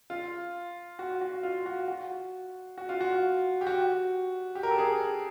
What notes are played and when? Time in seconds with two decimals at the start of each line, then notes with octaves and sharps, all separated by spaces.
0.10 F4
0.99 F#4
1.21 F#4
1.43 F4
1.66 F#4
1.88 F#4
2.78 F#4
2.89 F4
3.01 F#4
3.61 G4
3.67 F#4
4.55 G4
4.63 A#4
4.70 A4
4.78 G#4